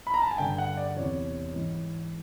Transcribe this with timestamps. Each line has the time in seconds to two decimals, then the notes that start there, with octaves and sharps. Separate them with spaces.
0.07 B5
0.14 A#5
0.22 A5
0.31 G#5
0.38 G2 D3 G5
0.58 F#5
0.77 D5
0.96 E2 C3 E3 C#5
1.54 G#2 E3